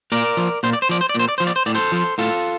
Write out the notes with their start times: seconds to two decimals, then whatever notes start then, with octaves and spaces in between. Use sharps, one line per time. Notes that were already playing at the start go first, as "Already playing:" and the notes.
0.12 A#2 A#4 D5
0.37 F3
0.63 A#2 C5
0.73 D5
0.82 C5
0.89 F3 D5
1.01 C5
1.09 D5
1.14 A#2
1.20 C5
1.29 D5
1.38 F3 C5
1.47 D5
1.56 C5
1.66 A2 D5
1.75 A4 C5
1.92 F3
2.18 A2 F4 A4